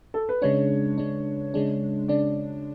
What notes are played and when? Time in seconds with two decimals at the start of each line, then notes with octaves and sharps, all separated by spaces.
0.14 A4
0.29 B4
0.42 C#3 G#3 D4 C#5
0.98 C#3 G#3 D4
1.54 C#3 G#3 D4
2.08 C#3 G#3 D4 D5